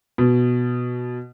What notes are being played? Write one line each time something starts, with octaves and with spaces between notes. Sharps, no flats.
B2